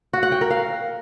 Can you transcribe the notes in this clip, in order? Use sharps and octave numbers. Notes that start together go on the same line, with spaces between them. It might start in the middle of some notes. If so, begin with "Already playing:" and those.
F#4
F#5
G5
A#4
F5